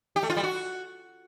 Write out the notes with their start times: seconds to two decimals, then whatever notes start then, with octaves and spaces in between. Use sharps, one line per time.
0.16 G4
0.23 A3
0.30 F4
0.36 G3
0.43 F#4